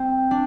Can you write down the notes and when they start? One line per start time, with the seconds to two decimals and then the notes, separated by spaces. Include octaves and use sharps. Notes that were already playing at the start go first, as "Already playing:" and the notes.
Already playing: C4
0.31 D4